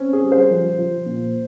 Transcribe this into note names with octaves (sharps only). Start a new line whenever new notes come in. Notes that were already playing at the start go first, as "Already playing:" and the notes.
Already playing: C4 C#4
G#4
G3
C5
F3
F3
A#2